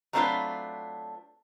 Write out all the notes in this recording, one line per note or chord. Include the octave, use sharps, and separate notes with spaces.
F#3 A3 C4 D4 F4 B4